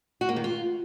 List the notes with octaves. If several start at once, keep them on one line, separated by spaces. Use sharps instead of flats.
F#4
A#3
D#3
F4